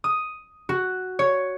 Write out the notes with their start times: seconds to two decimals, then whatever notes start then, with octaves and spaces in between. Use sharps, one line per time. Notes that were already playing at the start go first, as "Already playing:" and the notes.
0.04 D#6
0.69 F#4
1.19 C#5